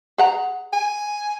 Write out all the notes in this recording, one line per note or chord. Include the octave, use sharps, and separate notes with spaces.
G#4 F#5 A#5
G#5